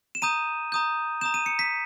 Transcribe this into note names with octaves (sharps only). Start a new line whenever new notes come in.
E7
A#5 D#6 G6 D#7
A#5 D#6 G6
A#5 D#6 G6 E7
D#7
C#7
B6